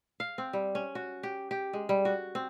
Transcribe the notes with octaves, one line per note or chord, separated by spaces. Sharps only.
F5
C4
G3
C#4
F#4
G4
G4
G#3
G3
F#4
C4